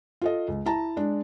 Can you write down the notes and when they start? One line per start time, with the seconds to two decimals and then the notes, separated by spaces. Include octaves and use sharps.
0.22 F4 A4 D#5
0.48 C#2
0.66 E4 A5 A#5
0.97 G#3 D4